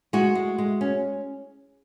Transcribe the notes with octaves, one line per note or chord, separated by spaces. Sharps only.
G#3 F#4
G#3
G#3
C#4